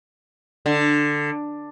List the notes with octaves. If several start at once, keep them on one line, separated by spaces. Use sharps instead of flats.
D3